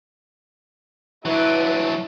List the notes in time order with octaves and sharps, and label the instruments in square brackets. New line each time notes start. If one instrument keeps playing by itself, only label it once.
[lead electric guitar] F#3 D4 [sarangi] E4 [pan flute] B4